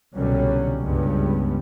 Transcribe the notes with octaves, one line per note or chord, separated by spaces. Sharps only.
C2 B2 D3 F#3 G3 C#4
C#2 G2 G3 G#3 B3